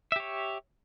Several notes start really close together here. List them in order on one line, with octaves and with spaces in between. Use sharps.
E5 G4 C#5